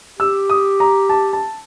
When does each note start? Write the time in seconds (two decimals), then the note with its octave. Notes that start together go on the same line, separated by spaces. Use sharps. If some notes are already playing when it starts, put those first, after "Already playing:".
0.19 G4 E6
0.50 D#6
0.80 A#5
1.09 A5
1.33 A5